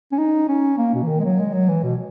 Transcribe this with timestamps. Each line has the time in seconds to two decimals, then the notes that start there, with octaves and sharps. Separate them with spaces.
0.12 C#4
0.18 D#4
0.48 C#4
0.78 A#3
0.94 B2
1.02 E3
1.08 D#3
1.20 G#3
1.24 F#3
1.39 G#3
1.53 F#3
1.69 E3
1.83 B2